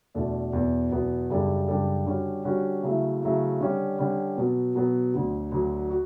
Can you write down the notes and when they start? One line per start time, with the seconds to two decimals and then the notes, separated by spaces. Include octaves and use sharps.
0.15 E2 B2 A3 D4 A4
0.53 E2 B2 F#3 B3
0.91 E2 B2 F#3 B3
1.30 F#2 C#3 G3 D4 A4
1.68 F#2 C#3 G3 D4 A4
2.06 D3 G3 C#4 F#4
2.45 D3 G3 C#4 F#4
2.83 C#3 F#3 A3 E4
3.22 C#3 F#3 A3 E4
3.61 D3 G3 C#4
3.99 D3 G3 C#4
4.37 B2 F#3 B3
4.75 B2 F#3 B3
5.14 D2 D3 F#3
5.52 D2 D3 F#3
5.90 F#4